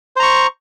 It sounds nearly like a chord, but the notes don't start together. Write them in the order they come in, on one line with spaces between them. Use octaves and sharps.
C5 A#5 C#6